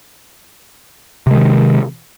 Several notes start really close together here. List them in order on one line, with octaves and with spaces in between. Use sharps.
C3 G#3 D#3